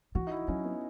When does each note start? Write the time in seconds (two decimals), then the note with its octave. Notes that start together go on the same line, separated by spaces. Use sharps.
0.15 E3 F#4
0.27 D#4
0.32 E4
0.48 F#3 C#4
0.65 B3